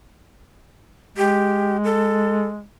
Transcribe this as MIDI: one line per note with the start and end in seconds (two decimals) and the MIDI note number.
1.17 2.65 56
1.17 1.77 67
1.84 2.46 69